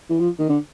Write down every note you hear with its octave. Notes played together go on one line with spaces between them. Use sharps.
E3
F3
D#3
D3